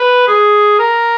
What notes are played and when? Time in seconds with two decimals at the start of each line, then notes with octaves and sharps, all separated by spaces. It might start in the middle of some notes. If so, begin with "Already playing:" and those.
Already playing: B4
0.27 G#4
0.79 A#4